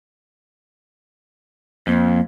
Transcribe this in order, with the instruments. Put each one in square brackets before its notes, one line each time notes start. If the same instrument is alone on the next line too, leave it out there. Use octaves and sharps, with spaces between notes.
[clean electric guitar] F2 [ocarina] A#3